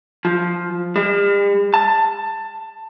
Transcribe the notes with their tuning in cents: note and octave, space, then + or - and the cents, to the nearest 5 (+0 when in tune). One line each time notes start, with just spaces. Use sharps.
F3 +5
G3 +45
A5 +15